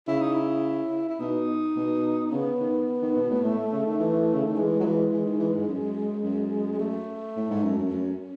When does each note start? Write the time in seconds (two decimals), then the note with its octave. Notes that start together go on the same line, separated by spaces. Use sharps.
0.07 C#3 E4
0.21 D#4
0.34 E4
1.09 E4
1.20 B2 D#4
1.76 B2
2.32 C#3 B3
2.60 D#3
3.02 D#3
3.16 B2
3.30 A2
3.43 A2 A3
3.72 C#3
3.86 D#3
3.99 E3
4.33 C#3
4.44 D#3
4.56 E3 G#3
4.80 F#3
4.84 E3
5.11 E3
5.25 D#3
5.39 E3
5.53 G#2
5.68 F#2
6.23 F#2
6.72 G#3
6.79 A3
7.36 A2
7.50 G#2
7.64 F#2
7.78 F#2
7.92 F#2 C#4